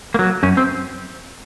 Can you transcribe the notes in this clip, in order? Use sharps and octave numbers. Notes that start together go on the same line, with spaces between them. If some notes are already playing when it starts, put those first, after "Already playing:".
A#3
F#3
F#2 C#4
C4